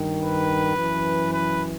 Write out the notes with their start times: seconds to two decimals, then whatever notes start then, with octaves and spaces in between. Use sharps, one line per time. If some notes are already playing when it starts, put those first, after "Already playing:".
Already playing: G2 D#3
0.17 B4
0.75 F#2 E3
1.32 B4